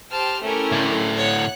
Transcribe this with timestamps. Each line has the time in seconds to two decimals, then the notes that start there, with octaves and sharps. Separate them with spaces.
0.11 G4 C5 G5 A5 F6
0.41 A3 C#4 E4 G4 A#4
0.72 A2 D3
1.16 C#5 F#5 F#6